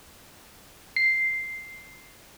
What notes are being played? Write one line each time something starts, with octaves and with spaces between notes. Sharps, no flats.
C7